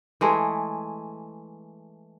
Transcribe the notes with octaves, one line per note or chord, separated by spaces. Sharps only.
E3 G#3 A3